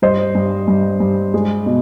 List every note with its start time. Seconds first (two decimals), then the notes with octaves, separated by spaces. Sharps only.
0.02 G2 C5 D#5
0.35 G2
0.68 G2
1.00 G2
1.34 G#3
1.66 B2